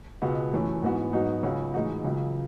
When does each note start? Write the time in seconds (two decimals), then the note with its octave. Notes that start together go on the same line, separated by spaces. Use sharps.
0.22 C#2 B2 G#3 B3 F#4
0.52 F#2 E3 A3 C#4
0.82 G#2 E3 B3 F#4
1.13 G#2 F#3 B3 D#4 F#4
1.43 C#2 C#3 F#3 C#4 F#4
1.74 A2 E3 G#3 D#4 F#4
2.04 C#2 C#3 F#3